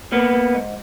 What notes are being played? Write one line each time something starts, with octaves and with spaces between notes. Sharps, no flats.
A#3 B3
A#3
G#2